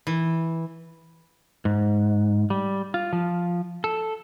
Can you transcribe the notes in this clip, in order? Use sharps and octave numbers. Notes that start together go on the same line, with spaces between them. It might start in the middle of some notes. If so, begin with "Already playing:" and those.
E3
G#2
G3
F4
F3
A4